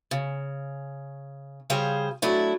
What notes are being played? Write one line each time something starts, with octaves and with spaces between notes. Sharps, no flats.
C#3
C#3 G3 G#4 C5 F5
F#3 A3 D4 E4